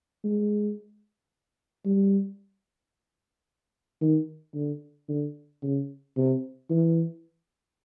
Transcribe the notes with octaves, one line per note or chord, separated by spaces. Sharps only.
G#3
G3
D#3
D3
D3
C#3
C3
E3